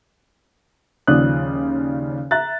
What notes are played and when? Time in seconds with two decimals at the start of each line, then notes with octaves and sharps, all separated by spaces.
1.07 D#2 C#3 F3 D5 D#6 F#6
2.31 E5 A#5 F#6 A6